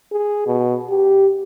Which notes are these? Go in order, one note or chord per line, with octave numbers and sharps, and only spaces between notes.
G#4
B2
G4